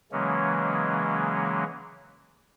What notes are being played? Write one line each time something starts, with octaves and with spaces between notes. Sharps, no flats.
C#3 E3 F#3 G#3 A#3 C#4